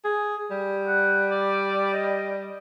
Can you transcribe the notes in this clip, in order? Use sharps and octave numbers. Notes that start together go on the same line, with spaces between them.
G#4
G3
F#5
D5
D#5